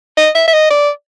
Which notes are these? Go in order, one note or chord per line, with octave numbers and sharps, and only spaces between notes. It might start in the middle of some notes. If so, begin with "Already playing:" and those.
D#5
E5
E5
D#5
D5